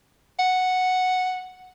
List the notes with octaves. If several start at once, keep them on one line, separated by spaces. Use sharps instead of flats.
F#5